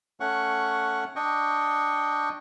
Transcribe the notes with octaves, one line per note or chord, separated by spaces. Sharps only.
A3 C#4 F#5 C#6
D4 D#5 G5 C#6